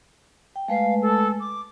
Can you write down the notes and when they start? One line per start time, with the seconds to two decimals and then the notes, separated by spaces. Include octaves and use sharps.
0.56 G5
0.68 G#3 A3 B4 F5
1.01 A4
1.40 D6